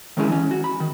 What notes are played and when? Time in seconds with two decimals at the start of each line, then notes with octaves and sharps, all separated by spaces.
0.17 D#3 G#3 C#4 E4 G#4
0.29 E3 C#4
0.51 F#4
0.64 B5
0.80 D#3